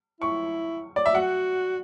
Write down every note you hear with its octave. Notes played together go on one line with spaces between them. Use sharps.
E4 C#6
D5
E5
F#4 F#5